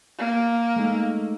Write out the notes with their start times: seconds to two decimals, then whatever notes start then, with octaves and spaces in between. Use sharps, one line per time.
0.18 A#3
0.76 G#3 A3 D#4